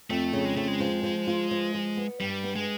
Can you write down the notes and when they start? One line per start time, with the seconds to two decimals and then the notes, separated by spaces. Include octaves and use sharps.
0.10 F2 A3
0.33 C#3
0.45 G#3
0.57 F2 A3
0.68 G#3
0.80 F3
1.03 F3
1.27 F4
1.51 F3
1.74 F3
1.97 B3
2.21 G2 G3
2.43 B3
2.56 G#3